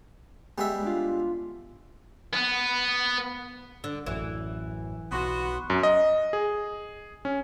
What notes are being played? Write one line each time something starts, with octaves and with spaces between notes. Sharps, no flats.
G3 G#3 B3 E5
D4 F4
B3
D3
A1 F#2 E3
B1 B3 F#4 C6
F#2
D#5
G#4
C#4